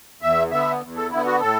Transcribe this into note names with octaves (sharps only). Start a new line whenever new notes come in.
E2 E5
D3 B3 E5
E2
A4
D3 B3 E4
F#4
A2 A4